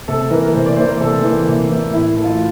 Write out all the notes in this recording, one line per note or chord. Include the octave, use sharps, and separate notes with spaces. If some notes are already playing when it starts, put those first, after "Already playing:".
C3 A4
E3 A#3 A#4
A#4
C3 C5
D5
E3 A#3 C5
A#4
C3 A4
E3 A#3
C3
E3 A#3
A2 E4
E3 A3
F4